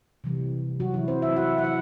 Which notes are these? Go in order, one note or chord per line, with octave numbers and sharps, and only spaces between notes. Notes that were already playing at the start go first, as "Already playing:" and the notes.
C3 E3 G3
F#3 F#4
E3 E4
C4 C5
E4 E5
F#4 F#5
F#5
E4 E5